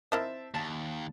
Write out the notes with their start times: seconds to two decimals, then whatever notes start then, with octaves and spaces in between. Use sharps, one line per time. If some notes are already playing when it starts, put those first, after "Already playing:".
0.12 C4 E4 A#4 D#5 E5 A5
0.54 D#2 A5